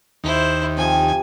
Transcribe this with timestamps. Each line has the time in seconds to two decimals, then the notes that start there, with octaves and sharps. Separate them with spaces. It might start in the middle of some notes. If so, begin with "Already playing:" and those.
0.24 D#2 E4 C5
0.77 C3 F3 G#5